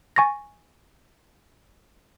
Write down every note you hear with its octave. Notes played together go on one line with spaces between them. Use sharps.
G#5 C#6 A6 A#6